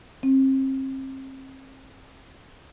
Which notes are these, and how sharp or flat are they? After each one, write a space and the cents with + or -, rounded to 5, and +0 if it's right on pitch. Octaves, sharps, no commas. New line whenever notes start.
C4 +35